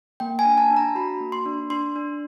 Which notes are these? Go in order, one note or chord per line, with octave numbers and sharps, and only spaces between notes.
A#3 G5
G#5
D4
A5
D4
A#5
F#4 B5
A#3
C6
D4
D4 C6
D4